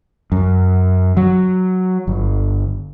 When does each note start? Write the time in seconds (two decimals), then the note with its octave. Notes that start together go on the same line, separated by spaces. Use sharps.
0.32 F#2
1.17 F#3
2.07 G1